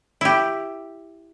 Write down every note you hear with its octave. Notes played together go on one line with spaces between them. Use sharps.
E4 G4